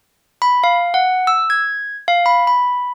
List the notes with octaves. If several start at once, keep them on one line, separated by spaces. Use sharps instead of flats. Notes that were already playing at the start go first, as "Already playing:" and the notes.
B5
F5
F#5
E6
G#6
F5
B5
B5